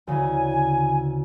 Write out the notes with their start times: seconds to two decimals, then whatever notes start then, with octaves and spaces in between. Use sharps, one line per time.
0.07 D2 C#3 E3 G#5